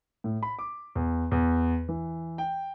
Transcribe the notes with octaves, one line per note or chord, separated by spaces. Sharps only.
A2
B5
D6
E2
E2
E3
G5